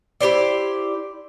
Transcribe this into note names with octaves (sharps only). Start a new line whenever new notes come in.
E4 G4 C5 D5